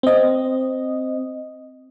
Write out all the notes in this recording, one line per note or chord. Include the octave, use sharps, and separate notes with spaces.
C4 D#5